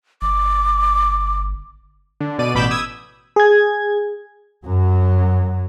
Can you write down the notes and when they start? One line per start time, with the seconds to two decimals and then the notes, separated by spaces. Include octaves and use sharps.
0.22 G1 D6
2.21 D3
2.39 B2 D5 D#7
2.54 A1 B2 B5 D6 G6 E7
2.71 D#6 E6 G#6
3.36 G#4 G#6
4.65 F#2 F#3